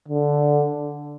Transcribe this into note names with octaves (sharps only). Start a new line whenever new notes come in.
D3